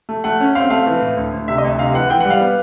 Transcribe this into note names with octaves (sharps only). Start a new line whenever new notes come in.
A3
A3 F#5
C#4
C4 F5
A3 F5
E3
A2
D2
D2
C3 E5
D#5
D2
C3 F5
E3 F#5
E3 G5
F#5
G3
F5
B3